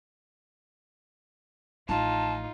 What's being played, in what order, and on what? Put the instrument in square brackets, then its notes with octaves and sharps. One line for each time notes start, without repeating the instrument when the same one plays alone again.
[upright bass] A1 F3 [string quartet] D#4 F4 [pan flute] A5